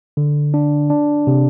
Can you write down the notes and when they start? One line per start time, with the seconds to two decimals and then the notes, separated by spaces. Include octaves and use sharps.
0.17 D3
0.54 D4
0.90 D4
1.27 C3